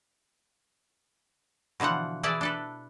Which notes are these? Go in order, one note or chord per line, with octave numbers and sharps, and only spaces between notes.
B2 D3 E3 F3 F#5
E3 E4 G#4 D5 A5
D4 A4 B4